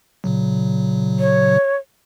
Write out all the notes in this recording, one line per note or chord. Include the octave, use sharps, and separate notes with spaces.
A#2 C#3 F#3
C#5